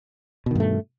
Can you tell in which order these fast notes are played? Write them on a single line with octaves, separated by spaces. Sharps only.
B2 D#3 G2 A3